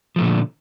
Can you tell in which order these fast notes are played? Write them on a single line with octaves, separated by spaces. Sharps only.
F3 A3 A#2 D3